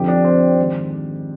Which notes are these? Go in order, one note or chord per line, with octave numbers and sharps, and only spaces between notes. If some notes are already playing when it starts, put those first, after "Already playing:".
Already playing: F2 D3 F3 G4
D4
C4
G#2 D#3